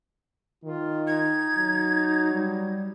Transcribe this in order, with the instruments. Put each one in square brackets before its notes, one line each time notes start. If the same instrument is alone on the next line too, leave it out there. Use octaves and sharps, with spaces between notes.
[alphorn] D#3 [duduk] F4
[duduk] D#4 [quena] G#6
[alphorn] F#3
[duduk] G3